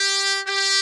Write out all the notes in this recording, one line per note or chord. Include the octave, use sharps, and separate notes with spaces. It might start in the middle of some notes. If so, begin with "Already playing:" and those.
Already playing: G4
G4